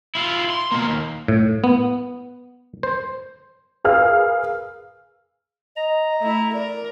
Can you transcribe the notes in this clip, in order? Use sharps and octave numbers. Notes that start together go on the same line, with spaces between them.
E4 F4
C6
B2 A#3
D#2
A2
B3
C5
G#4 A#4 B4 F5 E6 F6
D#5 A#5
A3 E4 E5
A#4 D5